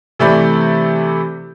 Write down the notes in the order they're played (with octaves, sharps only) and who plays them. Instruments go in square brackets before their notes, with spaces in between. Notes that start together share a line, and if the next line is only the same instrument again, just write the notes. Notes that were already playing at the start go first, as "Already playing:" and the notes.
[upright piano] C3 E3 A3 D5 B5 G6